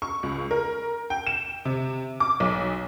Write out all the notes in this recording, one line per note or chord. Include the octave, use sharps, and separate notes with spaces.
C#6
C#2
A#4
G5
E7
C3
D6
B1